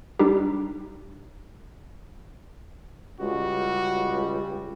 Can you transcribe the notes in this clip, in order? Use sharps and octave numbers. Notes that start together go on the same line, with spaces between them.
G3 D4 D#4 G4
C#2 G3 F#4